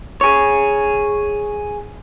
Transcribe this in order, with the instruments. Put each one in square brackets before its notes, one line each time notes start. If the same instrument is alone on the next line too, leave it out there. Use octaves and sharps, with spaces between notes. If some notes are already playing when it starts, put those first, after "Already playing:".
[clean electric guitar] G#4 C#5